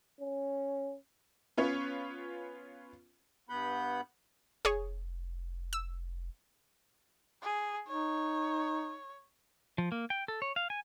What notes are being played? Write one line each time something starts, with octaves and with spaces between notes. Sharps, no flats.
C#4
B3 C#4 F4 B4 C#5
G2 B3 F#5 B5 G6
F1 G#4 C#5
E6
G#4
D#4 C#5
F3
A#3
G5
A4
C#5
F5
G#5